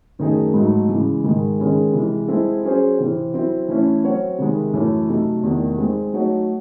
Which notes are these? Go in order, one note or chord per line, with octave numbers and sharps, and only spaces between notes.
F#2 D#3 A3 D#4 G#4
G#2 F#3 A3 D#4
C#3 E3 G#3
G#2 D#3 G#3
D#3 G#3 C#4 G#4
C3 E3 G#3
G#3 C4 E4 A4
F#3 C#4 G#4 C5
C3 E3 C4
F#3 C4 E4
E3 A3 C#4 E4
F#3 C4 F#4 C#5
C3 D#3 G#3 D#4
F#2 E3 A3 C#4
C3 F#3 A3 D#4 A4
E2 C3 D#3 A3
G#3 C4 D#4
F#3 A3 D#4 F#4 C#5